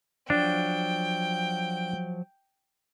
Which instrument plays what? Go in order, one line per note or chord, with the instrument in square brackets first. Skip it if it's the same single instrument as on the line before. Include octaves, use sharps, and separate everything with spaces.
[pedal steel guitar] F3 F#3 [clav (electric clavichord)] D4 [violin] G5